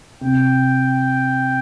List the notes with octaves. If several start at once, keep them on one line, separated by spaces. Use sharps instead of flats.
C3 G5